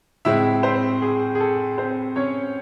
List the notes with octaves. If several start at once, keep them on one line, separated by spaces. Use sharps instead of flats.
A2 G#3 C4 E4 E5
C4 C5
G#4
G#4
A4
C4 C5
C#4 C#5